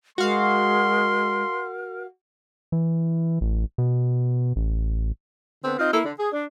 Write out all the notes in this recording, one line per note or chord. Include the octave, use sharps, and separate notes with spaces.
G#3 F#4 A#4 F5 C6
E3
A1
B2
A1
D3 B3 C4
C4 D#4 F4
A#3 E4 A4
D3
G#4
D4